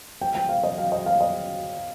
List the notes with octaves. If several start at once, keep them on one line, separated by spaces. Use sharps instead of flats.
G5
G5
F5
D#5
F5
D#5
F5
D#5